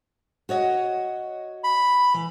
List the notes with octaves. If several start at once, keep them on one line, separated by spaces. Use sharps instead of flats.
F#4 C#5 D#5
B5
E3